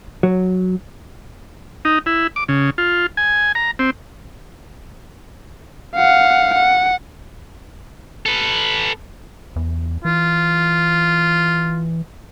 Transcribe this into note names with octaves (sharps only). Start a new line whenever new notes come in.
F#3
D#4
E4
D6
C#3
F4
G#5
A#5
C4
F5 F#5
F#5
A4 B4
E2
E3 F4